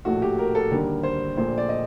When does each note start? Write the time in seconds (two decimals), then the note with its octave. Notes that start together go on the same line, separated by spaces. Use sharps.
0.05 A#1 A2 A3 F#4
0.22 G4
0.38 A#4
0.55 A4
0.71 D#2 D3 G3 A#4
1.03 C5
1.37 A#1 A#2 A3 C5
1.58 D5
1.69 D#5